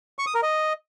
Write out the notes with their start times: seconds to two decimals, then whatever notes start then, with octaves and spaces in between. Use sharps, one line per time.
0.19 C#6
0.27 D#6
0.35 A#4
0.43 D#5